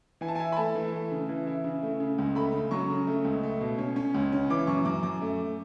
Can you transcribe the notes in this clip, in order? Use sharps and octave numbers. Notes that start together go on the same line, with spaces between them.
E3 G#5
A5
E4 G#5
B5
A3 A5
E3
A3
C#3
E3
E4
C#3
A3
C#3
C#2
A3 B5
C#3
F#3 C#6
C#3
A3
C#2
A3
B2
C#4
C#4
C#2
C#4
E3 D6
F#2 C#6
F#2 D6
F#2 D6
A3